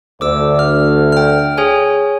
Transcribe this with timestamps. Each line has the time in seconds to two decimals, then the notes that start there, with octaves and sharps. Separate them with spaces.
0.21 D2 D6 E6
0.59 F6
1.12 G5 F6
1.58 G#4 C#5 G#5